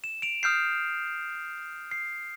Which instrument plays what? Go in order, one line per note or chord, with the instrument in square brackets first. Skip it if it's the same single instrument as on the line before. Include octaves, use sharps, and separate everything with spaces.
[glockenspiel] E7
D7 F7
D#6 F6 G6 C7
C7